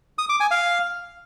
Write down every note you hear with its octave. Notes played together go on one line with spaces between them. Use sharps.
D#6
D6
G#5
F5